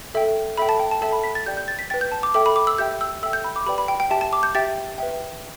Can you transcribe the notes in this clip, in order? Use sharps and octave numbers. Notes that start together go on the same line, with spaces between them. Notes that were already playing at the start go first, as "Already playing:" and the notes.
A4 E5 G5
A4 E5 G5 B5
A5
G5
A5
A4 E5 G5 A5
B5
B6
A6
G4 D5 G5 G6
G6
A6
B6
B4 G5 A6
G6
A5
D6
A4 E5 G5 D6
B5
D6
E6
G4 E5 G5 G6
E6
A4 E5 G5 E6
G6
B5
D6
G4 B4 D5 G5 B5
B5
G5
G5
G4 E5 G5 A5
A5
D6
G6
G4 E5 G5 A6
B4 E5 G5